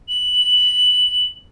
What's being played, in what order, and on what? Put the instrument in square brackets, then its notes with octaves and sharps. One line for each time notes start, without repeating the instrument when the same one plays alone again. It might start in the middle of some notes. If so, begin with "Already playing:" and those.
[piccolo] F#7